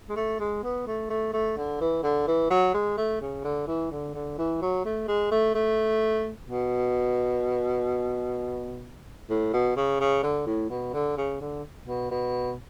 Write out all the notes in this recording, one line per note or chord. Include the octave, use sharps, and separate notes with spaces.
G#3
A3
G#3
B3
A3
A3
A3
D3
E3
D3
E3
F#3
G#3
A3
C#3
D3
E3
D3
D3
E3
F#3
A3
G#3
A3
A3
B2
A2
B2
C#3
C#3
D3
A2
B2
D3
C#3
D3
B2
B2